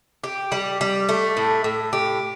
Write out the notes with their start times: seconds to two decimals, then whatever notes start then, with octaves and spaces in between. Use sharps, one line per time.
0.24 G4
0.52 G3
0.81 G3
1.09 A3
1.37 A2
1.64 A2
1.93 G4